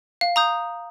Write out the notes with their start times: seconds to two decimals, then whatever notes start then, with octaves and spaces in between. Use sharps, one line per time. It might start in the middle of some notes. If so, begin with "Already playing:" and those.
0.21 F5
0.36 A#5 D#6 G6